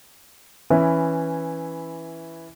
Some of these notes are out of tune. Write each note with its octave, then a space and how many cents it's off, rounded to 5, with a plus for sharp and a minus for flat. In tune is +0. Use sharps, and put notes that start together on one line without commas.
E3 +0 C#4 +0 E4 +0